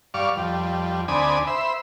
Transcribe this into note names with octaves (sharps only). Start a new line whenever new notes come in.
G2 D5 F5 C#6
F2 G3
D2 C4 D5 G#5 B5 D#6
C5 E5 B5